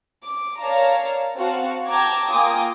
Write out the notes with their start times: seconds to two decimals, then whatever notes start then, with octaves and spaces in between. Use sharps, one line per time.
0.24 D6
0.60 A#4 C#5 D5 F5 A5 A#5
1.36 C4 F#4 F5 F#5 A5
1.87 G5 A5 A#5 D6 G#6
2.31 A#3 F4 G5 G#5 D6 D#6